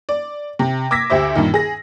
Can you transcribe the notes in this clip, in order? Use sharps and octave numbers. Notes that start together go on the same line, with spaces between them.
D5
C3
D6 E6 G#6 A#6 B6
D2 G4 C5 E5 D6
G2 A#2 D#3
G#4 A#6